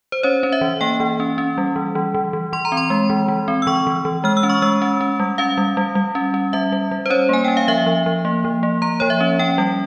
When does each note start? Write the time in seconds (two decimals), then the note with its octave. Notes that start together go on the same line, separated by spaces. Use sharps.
0.12 C5
0.23 C#4 C#5
0.43 C#4
0.52 E5
0.61 E3
0.81 A#3 G5
1.00 E3
1.20 C#4
1.38 C#4
1.58 G3
1.76 E3
1.95 E3
2.15 E3
2.33 E3
2.53 E3 C6
2.65 A#5
2.72 C4
2.77 C6
2.90 G#3
3.10 E3
3.28 E3
3.48 C4
3.62 E6
3.67 E3 C#6
3.87 E3
4.05 E3
4.24 G#3 F6
4.37 E6
4.43 C#4
4.50 C#6
4.62 G#3 E6
4.82 C#4
5.01 C#4
5.20 G3
5.38 C#4 F5
5.58 G3
5.77 G3
5.95 G3
6.15 C#4
6.34 C#4
6.53 G3 E5
6.72 G3
6.91 G3
7.06 C5
7.10 C#4 C#5
7.29 A#3 G#5
7.45 C#4 G5
7.57 F5
7.68 F3 E5
7.86 F3
8.06 F3
8.25 A#3
8.44 F3
8.63 A#3
8.82 A#3 A#5
9.00 F3 C#5
9.10 E5
9.21 C#4
9.39 C#4 G5
9.58 G3